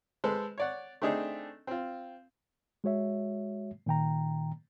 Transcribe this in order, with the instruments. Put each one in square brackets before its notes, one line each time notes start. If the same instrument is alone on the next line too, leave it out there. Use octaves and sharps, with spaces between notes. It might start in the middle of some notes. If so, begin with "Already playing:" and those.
[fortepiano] G#3 A4 B4 C5
C#5 D5 F#5
A3 C4 D4 D#4 G#4
C4 F4
[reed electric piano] G#3 F#4 C#5 E5
A#2 D#3 G5 A#5